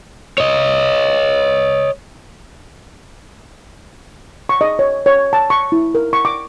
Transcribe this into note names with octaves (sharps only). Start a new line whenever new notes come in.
C#5 D#5
C#6
D#5
C#5
C#5
A5
C#6
E4
A#4
C#6
D6